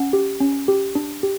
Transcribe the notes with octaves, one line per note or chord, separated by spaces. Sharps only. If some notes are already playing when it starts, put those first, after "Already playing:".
Already playing: C#4 F#5
G4
C#4
G4
D4
G4